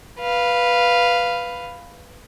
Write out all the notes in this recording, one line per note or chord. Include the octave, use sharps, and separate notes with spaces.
B4 F5